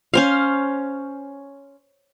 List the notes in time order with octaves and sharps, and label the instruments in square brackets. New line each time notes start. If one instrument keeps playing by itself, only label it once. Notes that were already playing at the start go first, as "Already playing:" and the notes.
[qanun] C#4 C5 F5